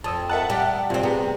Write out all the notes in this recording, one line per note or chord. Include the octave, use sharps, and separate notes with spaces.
F2 A5 D#6 E6
A#4 D#5 E5 F#5 A5 F#6
G3 G4
G2 C3 C4 F4
B3 G4 G#4 A#5